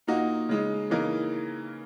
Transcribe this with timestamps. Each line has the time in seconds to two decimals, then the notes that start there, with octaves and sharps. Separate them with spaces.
0.07 A#2 A#3 D#4 F#4
0.49 C#3 G#3 D#4
0.90 C#3 E3 A#3 D#4 A#4